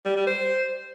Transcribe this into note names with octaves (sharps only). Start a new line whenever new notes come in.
G3
G3
C5